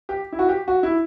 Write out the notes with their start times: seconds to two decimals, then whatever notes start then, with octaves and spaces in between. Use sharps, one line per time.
0.09 G4
0.32 E4
0.39 F#4
0.49 G4
0.68 F#4
0.83 E4